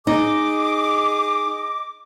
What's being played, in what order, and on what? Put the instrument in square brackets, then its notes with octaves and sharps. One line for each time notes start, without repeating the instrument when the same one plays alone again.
[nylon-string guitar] D#4 [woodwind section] G#4 D#5 D6